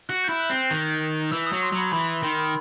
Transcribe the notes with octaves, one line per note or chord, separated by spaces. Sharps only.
F#4 F#6
E4 G6
F#6
C4
G6
D#3
E3 E6
D#6
F#3
C6
F#3
B5
E3 B5
B5
D#3 C6
B5